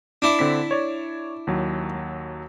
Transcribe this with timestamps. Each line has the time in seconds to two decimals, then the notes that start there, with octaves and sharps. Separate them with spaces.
0.22 D4 E4
0.39 D3 C4 B6
0.71 C#5 D5
1.47 D#2 F#3